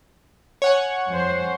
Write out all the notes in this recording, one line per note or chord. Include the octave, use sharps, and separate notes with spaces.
C#5 F#5 G#5
F2 C5